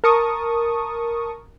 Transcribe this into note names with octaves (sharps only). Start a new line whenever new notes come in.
A#4 A5 C#6 D#6